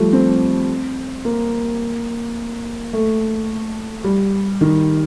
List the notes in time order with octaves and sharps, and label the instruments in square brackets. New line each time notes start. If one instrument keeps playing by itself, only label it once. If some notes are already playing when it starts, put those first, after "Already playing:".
Already playing: [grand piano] F3 G3 A3
C4
A#3
A3
G3
D#3